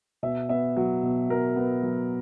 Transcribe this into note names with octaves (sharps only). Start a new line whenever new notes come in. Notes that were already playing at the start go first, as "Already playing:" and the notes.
B2 E5
B3 E5
F#3
B2
B2 A#4
B3
F#3